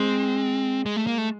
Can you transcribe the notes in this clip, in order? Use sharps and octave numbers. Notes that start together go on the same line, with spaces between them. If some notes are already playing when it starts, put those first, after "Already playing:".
Already playing: G#3 C4
G#3
A3
A#3
A3